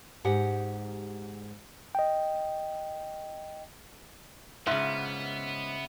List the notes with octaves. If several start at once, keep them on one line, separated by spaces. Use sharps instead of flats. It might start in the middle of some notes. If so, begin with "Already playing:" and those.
G#2 G4 F#5
D#5 G5
G#2 C#3 B3 F4 E5